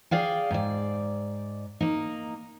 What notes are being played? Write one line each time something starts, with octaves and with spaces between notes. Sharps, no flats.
G#4 D5 F5 G5
G#2 D5
A#3 D#4